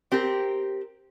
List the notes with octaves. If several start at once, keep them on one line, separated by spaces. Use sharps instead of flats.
C4 G4 A#4